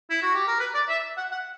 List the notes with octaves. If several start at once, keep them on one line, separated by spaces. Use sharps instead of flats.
E4
F#4
G4
A#4
B4
D5
E5
F#5
F#5